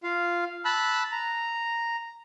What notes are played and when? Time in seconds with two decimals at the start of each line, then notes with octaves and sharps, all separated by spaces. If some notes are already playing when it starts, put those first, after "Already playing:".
0.03 F4 F5
0.65 A5 B5 E6 F#6
1.11 A#5